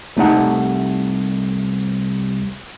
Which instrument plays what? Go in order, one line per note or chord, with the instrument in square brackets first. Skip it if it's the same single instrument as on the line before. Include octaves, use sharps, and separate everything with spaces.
[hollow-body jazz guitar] C2 A3 D#4 F#5